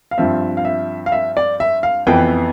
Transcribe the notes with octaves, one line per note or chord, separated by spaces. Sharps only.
F5
G2 F3 C4 E5
F5
E5
F5
E5
D5
E5
F5
F2 E3 B3 G5